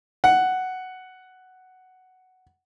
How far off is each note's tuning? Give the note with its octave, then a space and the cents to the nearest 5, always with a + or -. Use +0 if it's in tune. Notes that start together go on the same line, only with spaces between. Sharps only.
F#5 +5